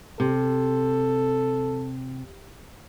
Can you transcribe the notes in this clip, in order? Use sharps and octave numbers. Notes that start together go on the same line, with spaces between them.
C3 A4